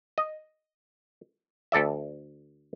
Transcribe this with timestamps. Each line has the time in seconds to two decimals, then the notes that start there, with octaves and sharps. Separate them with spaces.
0.18 D#5
1.72 D2 A4 D5 E5